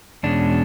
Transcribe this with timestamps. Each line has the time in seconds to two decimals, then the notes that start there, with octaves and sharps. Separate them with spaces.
0.23 E2 B2 G#3 C#4 D4